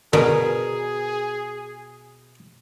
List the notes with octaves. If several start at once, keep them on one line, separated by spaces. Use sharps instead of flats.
B2 D3 G#4 A#4